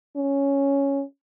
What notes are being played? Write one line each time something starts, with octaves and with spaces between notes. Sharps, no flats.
C#4